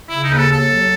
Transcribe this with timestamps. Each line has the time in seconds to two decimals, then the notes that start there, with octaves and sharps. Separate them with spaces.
0.09 C#3 E4
0.24 D#4
0.29 D#2 B4
0.38 A4
0.48 D#2 A4
0.66 F#3